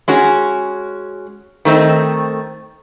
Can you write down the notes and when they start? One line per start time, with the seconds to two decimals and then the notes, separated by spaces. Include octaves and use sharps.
0.08 G#3 C#4 F#4 G#4
1.65 D#3 A3 C4 D#4